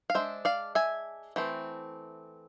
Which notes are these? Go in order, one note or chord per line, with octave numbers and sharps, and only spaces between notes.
F5
G#3 D4 C5 E5
D5 F5
E5 G#5
E3 A3 C4